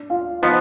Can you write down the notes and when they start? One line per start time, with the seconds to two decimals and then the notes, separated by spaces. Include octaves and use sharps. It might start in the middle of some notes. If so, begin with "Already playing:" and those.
Already playing: D4 D5
0.10 F4 F5
0.42 F3 B3 D#4 D#5